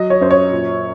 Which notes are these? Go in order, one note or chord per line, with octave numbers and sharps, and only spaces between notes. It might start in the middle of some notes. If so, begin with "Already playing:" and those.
Already playing: F#3 D#5
C#5
F#2 C5
C#5
A#2